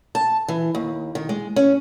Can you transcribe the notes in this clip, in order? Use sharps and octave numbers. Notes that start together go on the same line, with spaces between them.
A5
E3
D#2
D#3
G#3
C#4